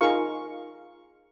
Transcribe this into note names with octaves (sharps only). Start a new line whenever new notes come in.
D#4 F4 G#4 A#4 F5 C#6